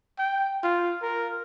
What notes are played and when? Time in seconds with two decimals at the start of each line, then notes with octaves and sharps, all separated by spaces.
0.19 G5
0.64 F4
1.03 A#4